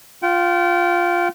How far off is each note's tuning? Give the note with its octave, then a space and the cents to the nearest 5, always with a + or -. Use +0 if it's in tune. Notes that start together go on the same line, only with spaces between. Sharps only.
F4 +0 G5 -35